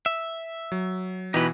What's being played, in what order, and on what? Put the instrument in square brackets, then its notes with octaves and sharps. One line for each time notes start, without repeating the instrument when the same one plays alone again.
[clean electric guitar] E5
[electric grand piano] F#3
[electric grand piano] B2 E3 [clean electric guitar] D#4 G4 B4